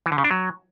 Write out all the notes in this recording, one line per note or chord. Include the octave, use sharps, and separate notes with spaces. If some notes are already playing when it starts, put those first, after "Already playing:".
E3
D3
C#3
D4
F#3